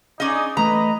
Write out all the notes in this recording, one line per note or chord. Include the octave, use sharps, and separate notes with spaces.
C#4 D#4 G#4 D5 D#5
E3 A3 B4 D#5 A#5